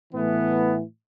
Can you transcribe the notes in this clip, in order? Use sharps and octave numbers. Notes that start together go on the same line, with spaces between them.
A2 E3 A3 B3